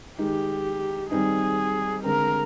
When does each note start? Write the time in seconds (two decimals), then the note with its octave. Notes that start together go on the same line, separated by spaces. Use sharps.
0.19 D#3 G#3 D#4 G4
1.11 D#3 G3 C4 D#4 G#4
2.04 D3 G#3 C4 A#4